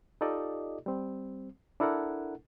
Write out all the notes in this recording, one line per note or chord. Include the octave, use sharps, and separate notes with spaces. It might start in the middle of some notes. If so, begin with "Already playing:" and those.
D#4 F4 G4 A4 D5 D#5
G3 C4
D4 E4 A4 A#4 F#5